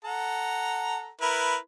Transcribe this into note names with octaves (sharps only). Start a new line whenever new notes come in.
A4 F#5 A#5
E4 A#4 B4